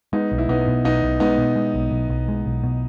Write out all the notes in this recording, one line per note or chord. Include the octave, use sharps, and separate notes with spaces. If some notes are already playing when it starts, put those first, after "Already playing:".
G#3 B3 D#4
B1
E4
B1 B3 D#4
B2
B1 B3 D#4
B1
G#3 B3 D#4
B2
G#3
B1
B1
B1
G#3
B1
B2